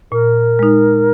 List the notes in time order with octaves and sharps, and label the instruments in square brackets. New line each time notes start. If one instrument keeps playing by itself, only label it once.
[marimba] A#2 [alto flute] A#4
[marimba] G#3 D#4